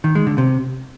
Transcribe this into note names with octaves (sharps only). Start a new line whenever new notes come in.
D#3
G#3
D3
C3